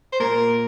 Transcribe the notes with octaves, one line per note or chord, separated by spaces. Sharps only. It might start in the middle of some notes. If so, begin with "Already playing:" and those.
C5
A#2 A#4